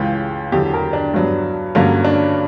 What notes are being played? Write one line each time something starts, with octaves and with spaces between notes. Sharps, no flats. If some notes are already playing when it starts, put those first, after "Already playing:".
Already playing: C#2 C#3 E3 G4
E2 D3 F#3 G4
A#4
D4
G2 F#3 B3
G2 D3 F#3 A#3 C#4
D4